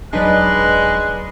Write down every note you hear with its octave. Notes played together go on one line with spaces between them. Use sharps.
D#1 F#3 G#3 D4 D#4 B4 D5 F#6